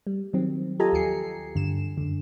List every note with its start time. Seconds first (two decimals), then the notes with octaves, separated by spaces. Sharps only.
0.07 G3
0.33 D#3 F#3 C4
0.80 F4 G4 A4 D#5 G#5 A#5
0.93 D#2 F3 G#5 C7 C#7
1.55 G2 D3 E7
1.97 F#2 D3